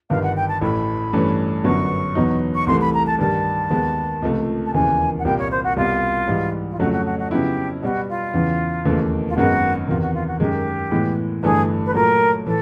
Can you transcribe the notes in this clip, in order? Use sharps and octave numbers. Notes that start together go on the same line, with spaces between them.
G1 G2 D#3 F5
F#5
G5
A5
A1 A2 E3 A3 B5
G2 E3 A3 C#4
G1 F#2 D3 F#3 B3 C#6
E2 B2 F#3 B3 D#4
C#6
C2 C3 E3 A3 C6
B5
A#5
A5
G2 D#3 G3 A5
D#2 D#3 G#3 B3
C#2 C3 F3 A3
A5
E1 D#2 C#3 E3 G#5
F#5
C2 A#2 G3 A#3 G5
C#5
C5
F#4
C2 B2 G3 F4
G#2 E3 G3
F4
F2 C#3 F#3 A3 F#4
F#4
F#4
F#4
F2 C#3 F#3 B3 E4 G4
B2 G3 B3 F#4
F4
E2 C#3 E3
E1 D#2 C#3 E3 A3
F4
G#1 F#2 D#3 G#3 B3 F#4
E2 C3 D#3 F4
F#4
F4
F#4
F#2 D#3 G#3 G4
A2 E3 G#3 B3
G1 G2 E3 A3 D4 G#4
B4
A#2 F#3 A3 A#4
A2 E3 A4